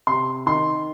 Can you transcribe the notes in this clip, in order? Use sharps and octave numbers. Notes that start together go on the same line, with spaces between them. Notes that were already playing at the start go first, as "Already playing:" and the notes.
C3 C6
D#3 C6